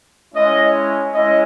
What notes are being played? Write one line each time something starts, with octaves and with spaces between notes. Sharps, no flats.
G#3 C#4 E4 D#5
G#3 C#4 E4 D#5